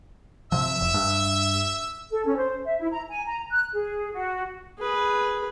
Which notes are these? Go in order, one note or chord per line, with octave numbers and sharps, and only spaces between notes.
C3 F3 E5 E6
F1
G2
A4
C#4
C5
E5
E4
A#5
G#5
A#5
F#6
G#4
F#4
G#4 B4